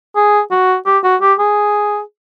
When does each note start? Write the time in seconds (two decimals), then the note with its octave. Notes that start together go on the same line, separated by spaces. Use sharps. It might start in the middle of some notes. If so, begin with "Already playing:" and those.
0.16 G#4
0.51 F#4
0.86 G4
1.04 F#4
1.22 G4
1.39 G#4